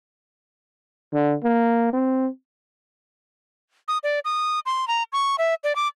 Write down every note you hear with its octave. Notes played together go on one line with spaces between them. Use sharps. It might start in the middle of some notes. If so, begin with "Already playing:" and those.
D3
A#3
C4
D#6
D5
D#6
C6
A#5
C#6
E5
D5
D6